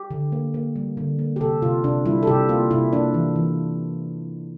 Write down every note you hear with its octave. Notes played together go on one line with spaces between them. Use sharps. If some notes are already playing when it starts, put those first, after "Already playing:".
Already playing: G4
D3
A#3
A#3
G3
D3
A#3
G4
C3 A4
C3 F4
C3 D4
G3 E4
A4
C3 G4
A#3 F4
C3 E4
A#3 D4
E3
E3